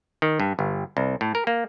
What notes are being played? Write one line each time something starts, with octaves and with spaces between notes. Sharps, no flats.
D#3
G2
G1
C2
A2
A#4
A#3